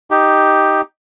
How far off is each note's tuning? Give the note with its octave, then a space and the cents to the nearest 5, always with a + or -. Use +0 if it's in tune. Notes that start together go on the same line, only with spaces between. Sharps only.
D#4 +0 G4 +0